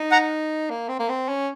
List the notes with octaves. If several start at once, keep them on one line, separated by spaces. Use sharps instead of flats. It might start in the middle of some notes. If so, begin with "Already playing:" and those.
Already playing: D#4
F#5 A#5
A#3
C4
A#3
C4
C#4